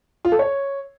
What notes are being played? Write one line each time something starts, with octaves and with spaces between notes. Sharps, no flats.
F4
A4
C#5